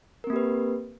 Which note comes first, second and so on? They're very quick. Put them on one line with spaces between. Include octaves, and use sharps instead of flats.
A#4 C4 A#3 G4 B4